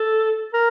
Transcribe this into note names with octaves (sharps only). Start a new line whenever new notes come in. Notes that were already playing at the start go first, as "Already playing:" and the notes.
Already playing: A4
A#4